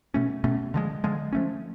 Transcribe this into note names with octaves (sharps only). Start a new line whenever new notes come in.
B2 A3 C#4
B2 A3 C#4
D3 F3 G#3
D3 F3 G#3
F3 A3 C#4